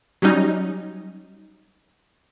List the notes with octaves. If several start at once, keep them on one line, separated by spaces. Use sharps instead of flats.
F#3 G3 C#4 D#4